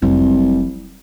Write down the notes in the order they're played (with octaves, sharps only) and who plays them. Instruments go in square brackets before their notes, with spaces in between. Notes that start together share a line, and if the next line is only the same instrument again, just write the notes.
[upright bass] F1 F#3 [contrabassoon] C2